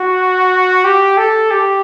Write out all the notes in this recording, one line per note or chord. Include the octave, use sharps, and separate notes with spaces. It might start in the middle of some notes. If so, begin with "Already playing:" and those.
Already playing: F#4
G4
A4
G4